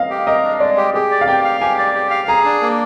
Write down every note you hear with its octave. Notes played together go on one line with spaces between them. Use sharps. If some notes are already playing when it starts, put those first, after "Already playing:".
Already playing: D#5 F5
G4
A#4 D#5
D4
G#3 D5
G4
G4 G#4
D5
F5
G4 G5
F5
G4 G#5
D5
G4
F5
G#4 A#5
D4
A#3